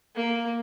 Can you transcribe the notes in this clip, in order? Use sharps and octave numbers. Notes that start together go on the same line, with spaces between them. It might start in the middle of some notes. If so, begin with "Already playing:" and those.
A#3